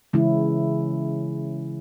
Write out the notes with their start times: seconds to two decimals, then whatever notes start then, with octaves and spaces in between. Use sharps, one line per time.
0.13 C#3 E3 G#3 C#4 E4